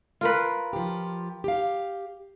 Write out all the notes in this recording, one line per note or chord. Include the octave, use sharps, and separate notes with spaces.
F4 A#4 B4
F3 G4
G4 F5